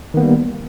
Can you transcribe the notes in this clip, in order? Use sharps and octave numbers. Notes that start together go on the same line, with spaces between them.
D#3 G3 A#3 B3